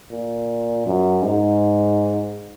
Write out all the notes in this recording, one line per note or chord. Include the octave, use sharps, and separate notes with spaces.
A#2
F#2
G#2